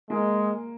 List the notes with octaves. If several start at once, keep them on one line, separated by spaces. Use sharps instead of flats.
G#3 A#3